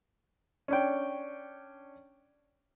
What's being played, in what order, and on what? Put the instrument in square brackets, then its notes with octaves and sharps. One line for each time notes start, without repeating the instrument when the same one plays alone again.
[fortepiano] C#4 D4 G5